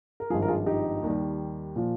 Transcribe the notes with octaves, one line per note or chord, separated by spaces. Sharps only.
A#4
G#1 G2 F3 F4 G#4
A#4
F4 G#4
D#4 G4
D#2 D#3 G3
A#2 F3